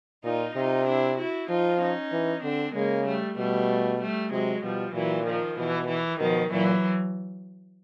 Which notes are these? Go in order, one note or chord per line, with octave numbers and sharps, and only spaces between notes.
A#2 D#4 F4
C3 D#4 F4
D4 E4
E4 F#4
F3 D#4 F4
C#4 D#4
E3
D3 C4 D4
C#3 G#3 A#3
G3 A3
B2 G3 A3
G3 A3
C3 F#3 G#3
B2 F3 G3
A#2 E3 F#3
D#3 F3
B2 E3
E3
B2 D#3 F3
A#2 E3 F#3